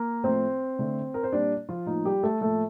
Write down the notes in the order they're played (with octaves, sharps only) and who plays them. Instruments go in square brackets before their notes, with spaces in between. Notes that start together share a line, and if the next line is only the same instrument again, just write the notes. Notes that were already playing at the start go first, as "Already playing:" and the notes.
Already playing: [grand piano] A#3 A#4
A2 F3 A3 C4 C5
D3 A3
A#4
C5
A#2 G3 A#3 D4 D5
F3 F4
A2 F3 A#3 D#4
G3 G4
A3 A4
A2 F3 A3 A#3 A4